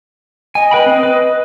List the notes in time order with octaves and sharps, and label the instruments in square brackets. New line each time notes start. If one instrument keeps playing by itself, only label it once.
[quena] D#5 [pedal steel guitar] G#5
[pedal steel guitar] B4 G5 B5
C4
B4